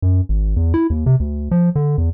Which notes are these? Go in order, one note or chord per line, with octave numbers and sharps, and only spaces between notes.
F#2
G#1
E2
E4
D#2
C3
D2
F3
D3
E2